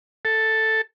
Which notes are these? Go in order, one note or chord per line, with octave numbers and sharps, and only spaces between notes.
A4